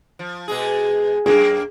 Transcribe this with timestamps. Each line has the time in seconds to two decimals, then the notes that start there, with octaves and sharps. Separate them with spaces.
0.19 F3
0.48 B2 G#3 G#4
1.26 F#2 A#3 G#4